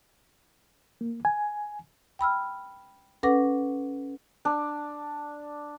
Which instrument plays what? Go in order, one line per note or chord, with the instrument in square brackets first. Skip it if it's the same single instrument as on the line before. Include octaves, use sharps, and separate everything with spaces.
[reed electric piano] A#3
G#5
[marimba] G5 B5 E6 F6
C#4 A4 B4 F#5 D6 A#6
[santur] D4